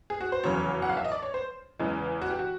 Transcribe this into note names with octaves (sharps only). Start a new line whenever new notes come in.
G#4
F#4
C5
F1 E2 C#3 F#3 C#5
F#5
F5
E5
D#5
D5
C#5
C5
E2 C#3 E3 G#3
F#4
G4
F#4